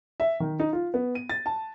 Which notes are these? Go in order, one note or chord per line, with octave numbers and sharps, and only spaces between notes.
E5
D#3
D#4
F4
B3
D#7
A6
A5